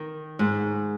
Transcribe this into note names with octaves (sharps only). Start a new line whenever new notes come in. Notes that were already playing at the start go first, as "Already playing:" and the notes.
Already playing: D#3
G#2